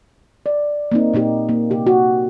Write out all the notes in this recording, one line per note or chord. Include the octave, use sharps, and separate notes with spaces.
D5
A#3 C4 D#4
A#2 A#3 D#4 G4
A#3
C3 G4
F#4